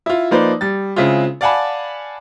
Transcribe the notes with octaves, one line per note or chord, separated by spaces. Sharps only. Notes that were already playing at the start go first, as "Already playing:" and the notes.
E4 F4
F3 A#3 D#4 B4 C5 D5
G3 A6
C#3 G#3 C4 E4 F4
D5 F5 F#5 G#5 A5 B5